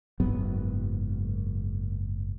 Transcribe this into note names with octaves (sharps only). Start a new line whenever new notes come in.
F#1 G#2 F#3 B3